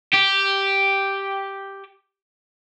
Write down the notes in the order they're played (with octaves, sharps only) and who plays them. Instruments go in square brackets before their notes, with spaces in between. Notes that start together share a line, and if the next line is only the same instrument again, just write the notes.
[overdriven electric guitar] G4